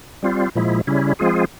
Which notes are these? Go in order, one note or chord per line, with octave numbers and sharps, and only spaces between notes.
G3 C4 F4
A#2 F3 G#3 E4
C#3 G3 C#4 E4
F3 G#3 C4 F4 G#4